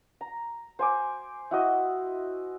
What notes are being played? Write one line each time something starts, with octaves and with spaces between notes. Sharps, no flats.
A#5
C5 G#5 D6
E4 F#4 D#5